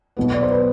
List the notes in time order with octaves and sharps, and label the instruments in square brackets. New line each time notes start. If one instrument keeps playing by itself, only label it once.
[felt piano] B1 B2 B3
D5
C5
B4